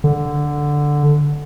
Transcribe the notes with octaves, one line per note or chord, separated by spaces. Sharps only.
D3